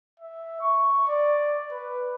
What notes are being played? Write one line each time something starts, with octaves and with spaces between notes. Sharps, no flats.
E5
C#6
D5
B4